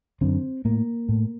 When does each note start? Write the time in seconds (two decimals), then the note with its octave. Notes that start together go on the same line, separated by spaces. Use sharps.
0.21 F#2 D3 C4
0.65 A2 A#3
1.09 A2